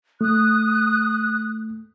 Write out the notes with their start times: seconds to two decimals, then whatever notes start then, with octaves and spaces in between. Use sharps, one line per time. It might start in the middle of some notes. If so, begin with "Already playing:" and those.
0.21 A3 D#6 F#6